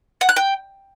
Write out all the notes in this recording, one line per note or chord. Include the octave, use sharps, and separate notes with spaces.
F#5
F#6
G5